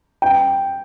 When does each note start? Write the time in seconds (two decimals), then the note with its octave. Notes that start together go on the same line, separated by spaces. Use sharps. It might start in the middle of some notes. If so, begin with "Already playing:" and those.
0.22 G5